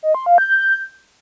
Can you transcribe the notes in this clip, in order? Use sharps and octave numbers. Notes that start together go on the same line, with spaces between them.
D#5
C6
F5
G6